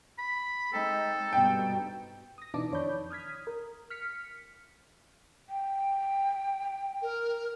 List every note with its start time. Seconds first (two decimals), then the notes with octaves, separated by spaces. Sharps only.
0.19 B5
0.73 G#3 C4 D#4 A4
1.33 G2 B2 G5
2.38 D#6 A#6
2.54 B2 E3 D4 D#4 A5 D6
2.71 F2 D#3 C#5 D5 B5 G6
3.10 D#6 F6 G#6 B6
3.47 A#4
3.90 F6 B6 C#7
5.49 G5
7.02 A#4